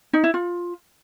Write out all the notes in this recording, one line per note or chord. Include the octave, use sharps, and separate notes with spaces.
D#4
E4
F4